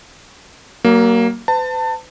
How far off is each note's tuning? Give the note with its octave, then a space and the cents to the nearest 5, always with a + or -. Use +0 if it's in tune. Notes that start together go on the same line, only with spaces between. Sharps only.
F#3 +40 A#3 +0
B4 +45 A5 +25